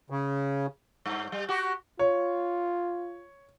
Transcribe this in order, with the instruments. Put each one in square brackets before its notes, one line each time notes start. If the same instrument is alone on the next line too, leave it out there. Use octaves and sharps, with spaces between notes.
[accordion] C#3
[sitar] G2
G3
F#4 G4
[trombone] F4 [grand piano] C#5